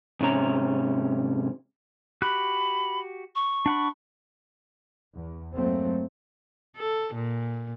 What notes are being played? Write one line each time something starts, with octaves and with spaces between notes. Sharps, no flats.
G#2 C3 C#4 A#5
F#4 G4 B5 F#6
C#6
D4 F#5 B5
E2
G1 F#3 A3 A#3 C4
A4
A#2